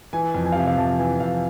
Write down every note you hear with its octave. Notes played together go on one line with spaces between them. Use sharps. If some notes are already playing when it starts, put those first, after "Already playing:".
E3 G#5
F2
G#5
F5
C3 E5
F5
F2 A5
E3 G#5
F2 F5